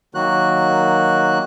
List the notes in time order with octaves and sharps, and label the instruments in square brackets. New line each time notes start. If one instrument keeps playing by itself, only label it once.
[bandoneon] D#3 F#3 A#3 F#4 F#6